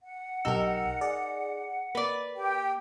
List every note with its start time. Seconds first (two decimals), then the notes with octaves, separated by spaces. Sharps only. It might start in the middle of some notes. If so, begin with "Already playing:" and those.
0.01 F#5
0.45 B1 D#4 G4 A#4 E6
1.01 G#4 D5
1.95 A#3 B4 D5
2.36 G4 G5